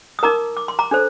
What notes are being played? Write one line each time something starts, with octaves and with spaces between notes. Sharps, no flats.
D#6
D#4 A#4 A#5 D6
D6
C6
A#5 D6
D4 A4 C5